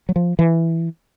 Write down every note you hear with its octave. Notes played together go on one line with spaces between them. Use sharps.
F#3
F3
E3